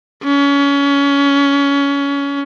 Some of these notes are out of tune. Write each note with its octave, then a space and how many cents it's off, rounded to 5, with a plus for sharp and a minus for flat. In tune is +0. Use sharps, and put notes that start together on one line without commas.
C#4 +25